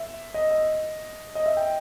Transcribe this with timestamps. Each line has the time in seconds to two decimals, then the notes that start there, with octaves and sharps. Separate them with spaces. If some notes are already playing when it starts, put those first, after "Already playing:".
Already playing: E5
0.34 D#5
0.51 D#5
1.35 D#5
1.46 E5
1.57 G5